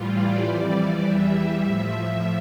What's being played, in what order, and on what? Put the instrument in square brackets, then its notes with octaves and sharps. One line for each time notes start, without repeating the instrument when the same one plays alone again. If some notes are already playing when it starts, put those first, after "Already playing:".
Already playing: [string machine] A2 E3 G3 F4
D5
F2 E3 G3
E2 E3 G3 E5
E5
A2 F3